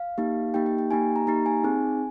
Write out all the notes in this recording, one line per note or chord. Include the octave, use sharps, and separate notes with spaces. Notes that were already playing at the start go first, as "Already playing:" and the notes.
Already playing: F5
A#3 D#4 G4
A#3 D#4 G4 G5
G5
G5
A#3 D#4 G4 G#5
A#5
A#3 D#4 G4 A#5
G#5
C4 D#4 G#4